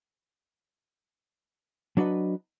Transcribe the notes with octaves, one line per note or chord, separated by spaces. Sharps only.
F#3 D4 F#4 B4 D#5